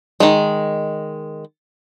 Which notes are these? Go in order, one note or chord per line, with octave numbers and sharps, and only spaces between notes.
D#3 G#3